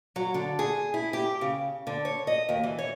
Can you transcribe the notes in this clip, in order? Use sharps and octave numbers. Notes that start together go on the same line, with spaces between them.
F#3
D3
G#4
E4
G4
C#3
D3
C#5
D#5
D#2
E3
C#5